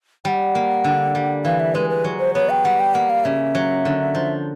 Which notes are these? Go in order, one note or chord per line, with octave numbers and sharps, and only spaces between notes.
G3 F#5 G5
A#3
D3
G3
E3 F5
E5
G#3 B4
B4
F#3
C5
B3 C#5
G5
G3 F#5
G5
A#3 F#5
F5
C#3 E5
F#3
D3
F3